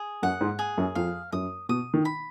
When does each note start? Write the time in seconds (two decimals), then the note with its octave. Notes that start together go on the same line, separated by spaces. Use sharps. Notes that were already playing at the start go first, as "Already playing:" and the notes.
Already playing: G#4
0.23 F#2 F#5
0.41 G#2
0.59 G#4
0.78 F#2
0.95 F2 F5
1.32 F#2 D#6
1.69 B2 D#6
1.94 D#3
2.05 B5